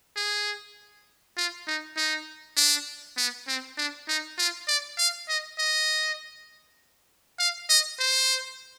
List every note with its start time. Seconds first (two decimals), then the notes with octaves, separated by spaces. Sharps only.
0.16 G#4
1.37 F4
1.67 D#4
1.97 D#4
2.57 D4
3.17 B3
3.48 C4
3.78 D4
4.08 D#4
4.38 F4
4.68 D5
4.98 F5
5.29 D#5
5.58 D#5
7.39 F5
7.70 D#5
7.99 C5